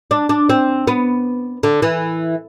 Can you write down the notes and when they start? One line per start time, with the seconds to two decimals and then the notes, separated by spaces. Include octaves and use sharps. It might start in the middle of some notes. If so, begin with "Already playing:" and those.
0.11 D4
0.29 D4
0.49 C4
0.87 B3
1.63 D3
1.82 E3